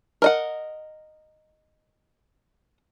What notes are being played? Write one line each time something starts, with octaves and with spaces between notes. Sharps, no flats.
A#4 D#5 F#5